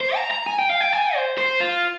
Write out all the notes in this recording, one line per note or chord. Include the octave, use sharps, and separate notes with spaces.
C5
A#5
A#5
G#5
G5
F5
G5
G#5
C5
C5
F4